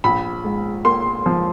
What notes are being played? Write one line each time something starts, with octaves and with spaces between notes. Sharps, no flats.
A#1 B5
G#2
A#3 C6
F3